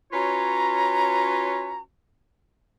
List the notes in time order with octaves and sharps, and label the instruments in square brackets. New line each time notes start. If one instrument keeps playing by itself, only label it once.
[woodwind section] C#4 F4 F#4 B4 C#5 A#5